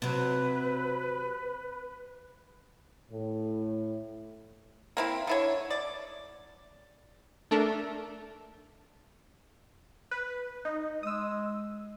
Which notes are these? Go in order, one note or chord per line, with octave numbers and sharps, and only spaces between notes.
C3 F#3 B4
A2
A#3 C4 E4
D3 E4 C#5
D5
A3 D4 A4 A#4
B4
D#4
G#3 D#6 E6